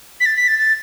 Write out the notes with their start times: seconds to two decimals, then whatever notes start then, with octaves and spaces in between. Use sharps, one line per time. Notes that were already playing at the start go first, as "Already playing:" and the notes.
0.20 B6
0.26 A6
0.36 B6
0.48 A6
0.59 A6